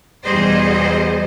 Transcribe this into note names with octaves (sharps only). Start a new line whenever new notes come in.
E2 B2 G3 G#4 C5 D#5